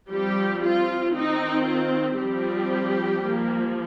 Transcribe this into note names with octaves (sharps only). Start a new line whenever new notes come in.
F3 G3 C4 G4
F4
D#3 C4 D#4
F4
F3 G3 C4 G4
F3 A#3